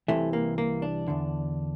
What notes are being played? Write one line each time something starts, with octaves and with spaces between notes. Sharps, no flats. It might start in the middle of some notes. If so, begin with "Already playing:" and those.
C2 C3 E3 A3
A#3
A#3
D4
E2 D3